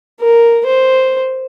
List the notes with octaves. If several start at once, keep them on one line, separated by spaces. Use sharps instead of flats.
A#4
C5